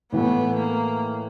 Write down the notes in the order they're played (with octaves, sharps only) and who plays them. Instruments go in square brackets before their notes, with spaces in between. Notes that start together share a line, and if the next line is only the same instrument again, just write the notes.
[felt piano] A2 E3 A3 [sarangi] B3
[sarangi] A#3